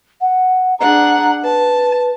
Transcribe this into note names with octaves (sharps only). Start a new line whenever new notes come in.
F#5
D4 G#4 F#5 A#5
B4 A5